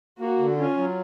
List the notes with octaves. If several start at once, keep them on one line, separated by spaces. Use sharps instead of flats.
A#3 F#4
D3
C#4 F4
F#3